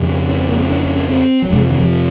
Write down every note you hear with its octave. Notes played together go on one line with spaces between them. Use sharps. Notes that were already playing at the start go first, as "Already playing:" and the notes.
Already playing: F2 C#3
C#4
C4
A#3
C4
C#4
C#4
C#4
C4
F#3
F2 C3 G#3
F3
D#3
F3